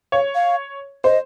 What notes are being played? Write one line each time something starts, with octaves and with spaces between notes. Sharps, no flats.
C#5 F5
F5
C5 D#5